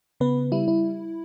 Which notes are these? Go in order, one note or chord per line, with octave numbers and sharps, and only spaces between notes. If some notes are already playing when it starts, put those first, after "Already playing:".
C#3 B3 B4
G3 E4
E4